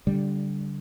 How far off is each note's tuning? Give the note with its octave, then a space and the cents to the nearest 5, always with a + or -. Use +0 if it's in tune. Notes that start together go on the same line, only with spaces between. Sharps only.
D3 -15 G3 +0